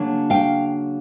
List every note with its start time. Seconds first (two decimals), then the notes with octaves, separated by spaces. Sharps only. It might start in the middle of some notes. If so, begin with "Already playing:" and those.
Already playing: C#3 F#3 A#3 D4
0.30 F5 G5